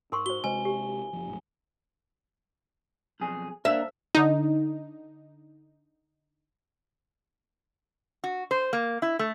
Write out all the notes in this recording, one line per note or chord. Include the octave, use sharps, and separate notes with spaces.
G#2 A#4 C6 C#6
F#4 C5 G7
C3 G#3 B4 C5 D#5 G#5
G4
F#1 F3
A#1 F#2 A2
B1 F2 G#4
A#3 D4 E5
D3 D#4
F#4
C5
A#3
E4
A3